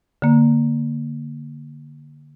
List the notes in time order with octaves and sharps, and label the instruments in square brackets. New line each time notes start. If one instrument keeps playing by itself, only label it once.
[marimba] D3 A#3